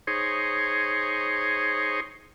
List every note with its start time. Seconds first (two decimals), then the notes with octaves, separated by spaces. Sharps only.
0.07 D#4 G#4 C5 C#5